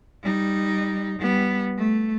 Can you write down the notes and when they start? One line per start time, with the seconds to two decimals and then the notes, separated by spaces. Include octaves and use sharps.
0.23 G3 D#4
1.19 G3 B3
1.77 A3